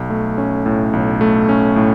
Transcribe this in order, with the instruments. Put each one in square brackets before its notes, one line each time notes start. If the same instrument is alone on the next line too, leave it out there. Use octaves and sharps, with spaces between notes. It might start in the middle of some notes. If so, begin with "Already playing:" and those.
Already playing: [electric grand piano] B1
A3
C#4
A2
B1
A3
C#4
A2